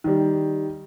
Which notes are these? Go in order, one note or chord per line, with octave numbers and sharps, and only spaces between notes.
D#3 G3